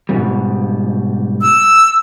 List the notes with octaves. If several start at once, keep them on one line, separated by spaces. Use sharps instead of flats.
G#2 B2 G3
E6